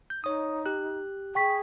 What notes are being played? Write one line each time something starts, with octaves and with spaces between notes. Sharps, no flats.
G6
D#4 C#5 D#6
G4 F#6
G#4 G5 C#6 B6